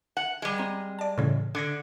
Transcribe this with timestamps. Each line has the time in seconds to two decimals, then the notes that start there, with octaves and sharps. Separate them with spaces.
0.17 F#5
0.42 G3 G#3
0.56 C4 A#5 D#7
0.99 D5 A5
1.18 A2 C#3 E3
1.55 D3 D6 G#6 A#6